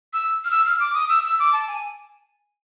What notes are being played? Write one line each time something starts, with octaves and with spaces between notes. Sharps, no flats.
E6
F6
E6
F6
D6
D#6
E6
E6
D6
A5
G#5